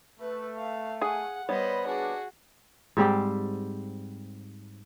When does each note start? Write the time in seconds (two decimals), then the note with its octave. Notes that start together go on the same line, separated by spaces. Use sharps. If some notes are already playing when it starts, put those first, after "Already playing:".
0.20 A3 B4
0.57 F5
1.01 G#4 F#5 G#5
1.49 G3 B3 C5 C#5 D#5 B5
1.86 D4 F#4 G#4
2.97 G#2 G3 C4 G4